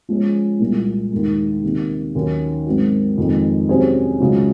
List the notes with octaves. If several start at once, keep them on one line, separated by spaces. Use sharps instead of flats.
F3 G#3 C#4 G#4
C2 A#2 G#3
D#2 D#3 G#3 D#4
C3 D#3 A#3
D#2 D#3 F#3 C#4
G#2 F#3 C4 F#4
F2 D#3 G#3
C3 F#3 C#4 G#4 C5
C#2 C#3 F#3